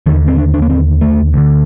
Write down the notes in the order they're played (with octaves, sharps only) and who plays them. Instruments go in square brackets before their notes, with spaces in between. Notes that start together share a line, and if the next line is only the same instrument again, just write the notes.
[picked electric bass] D#2 D3 D#3
C4
D4
D4
A#3
C4
A3
D2 D3